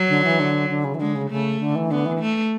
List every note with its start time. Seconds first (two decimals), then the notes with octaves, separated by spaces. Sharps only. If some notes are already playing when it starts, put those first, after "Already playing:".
Already playing: F#3
0.09 D3
0.24 E3
0.39 D3
0.70 D3
0.84 C#3
0.95 E3
1.00 D3 G#3
1.15 C#3
1.30 C#3 A3
1.60 D3
1.76 E3
1.91 D3 B3
2.06 E3
2.20 A3